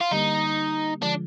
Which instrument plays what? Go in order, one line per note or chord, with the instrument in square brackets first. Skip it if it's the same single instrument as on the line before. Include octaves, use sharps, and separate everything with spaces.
[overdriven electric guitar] F4
[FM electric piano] D3 G3 A#3 [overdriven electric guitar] D#4
[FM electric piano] D3 F3 G#3 [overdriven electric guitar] D4